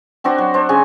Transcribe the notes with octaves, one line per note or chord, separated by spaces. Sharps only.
C4 D4 F#4 C5
F#3
D4 C5
C#3 G#5 C#6